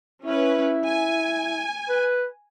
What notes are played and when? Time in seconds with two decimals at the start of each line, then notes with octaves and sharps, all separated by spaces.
0.25 C#4 E4 B4
0.86 G#5
1.89 B4